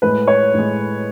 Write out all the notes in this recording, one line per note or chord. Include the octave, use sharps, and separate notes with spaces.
A2 G#3 B4
C#5
A2 G#3